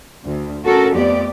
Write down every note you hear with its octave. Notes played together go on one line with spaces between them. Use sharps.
D2
C#4 F#4 A4 A#4
F2 A3 B3 G4 D5